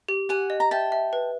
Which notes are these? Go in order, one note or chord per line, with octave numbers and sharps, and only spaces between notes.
G4
G4 F#5 G#5
D#5
A#5
E5 G5 A5
E5
B4